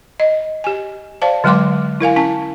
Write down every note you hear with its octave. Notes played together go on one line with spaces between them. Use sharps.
D#5
G4 G#5
C5 D5 F5 A5
D3 F#3 G#3 G5 C6 D6
E4 A#4 F5 G#5
C#4 E4 G#5 A5